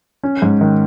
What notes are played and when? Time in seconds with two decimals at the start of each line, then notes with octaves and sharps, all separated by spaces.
0.23 C#4
0.42 G#2
0.61 D#3